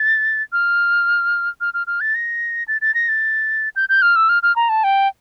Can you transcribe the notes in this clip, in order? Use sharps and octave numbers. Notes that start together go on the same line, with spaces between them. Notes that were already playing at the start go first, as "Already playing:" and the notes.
Already playing: A6
F6
F6
F6
F6
A6
A#6
A6
A6
A#6
A6
G6
G6
F6
E6
F6
F6
A#5
A5
G5